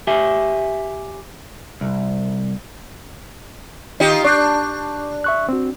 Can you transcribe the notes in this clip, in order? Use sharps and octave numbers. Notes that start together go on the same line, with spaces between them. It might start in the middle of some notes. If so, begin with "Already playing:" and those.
G4 E5 G#5
C2
D#3 D#4 F4 G4
D4 C#6 D6 G6
E5 C#6 F#6
C4 F#4